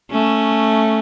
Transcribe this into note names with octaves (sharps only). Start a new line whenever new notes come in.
A3 C#4